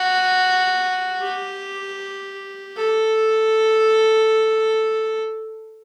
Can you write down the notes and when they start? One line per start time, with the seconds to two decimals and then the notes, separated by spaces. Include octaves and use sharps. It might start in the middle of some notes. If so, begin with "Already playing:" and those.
Already playing: F#4
1.21 G4
2.76 A4